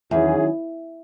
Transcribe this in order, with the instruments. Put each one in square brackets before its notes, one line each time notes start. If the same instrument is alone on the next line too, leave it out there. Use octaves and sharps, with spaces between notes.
[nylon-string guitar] E2 [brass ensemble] D#3 F#3 C#4 E4 G#4